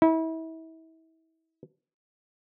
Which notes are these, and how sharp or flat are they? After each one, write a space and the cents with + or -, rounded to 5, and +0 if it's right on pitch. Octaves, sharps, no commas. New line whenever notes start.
E4 -35